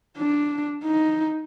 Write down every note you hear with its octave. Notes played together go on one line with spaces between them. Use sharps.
D4
D#4